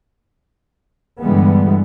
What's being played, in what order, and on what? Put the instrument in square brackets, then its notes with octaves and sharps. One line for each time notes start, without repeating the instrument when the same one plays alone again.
[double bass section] G2 D3 E3 G3 G#3 B3